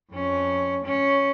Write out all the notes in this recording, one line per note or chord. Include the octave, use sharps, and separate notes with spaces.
F2 C#4
C#4